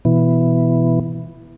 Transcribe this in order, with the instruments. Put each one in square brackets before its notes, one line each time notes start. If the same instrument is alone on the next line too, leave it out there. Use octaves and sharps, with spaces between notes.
[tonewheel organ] B2 E3